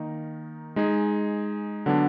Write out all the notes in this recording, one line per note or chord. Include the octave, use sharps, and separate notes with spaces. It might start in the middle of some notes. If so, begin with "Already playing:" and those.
Already playing: D#3 A#3 D#4 A#4
G#3 D#4 G#4
D3 F#3 B3 D4